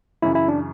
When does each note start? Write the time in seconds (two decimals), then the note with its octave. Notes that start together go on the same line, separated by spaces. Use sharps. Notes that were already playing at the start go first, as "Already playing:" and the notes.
0.22 F#2 C#3 E3 E4
0.35 E4
0.48 D4